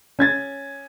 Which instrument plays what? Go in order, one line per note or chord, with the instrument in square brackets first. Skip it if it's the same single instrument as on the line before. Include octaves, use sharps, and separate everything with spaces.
[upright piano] C#4 G#6 A6